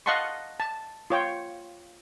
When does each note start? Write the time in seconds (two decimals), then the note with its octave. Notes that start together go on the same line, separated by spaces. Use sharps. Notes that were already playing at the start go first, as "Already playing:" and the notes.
0.06 D#5 F5 F#5 A5 C6 C#6
0.60 A5
1.10 F4 C#5 G5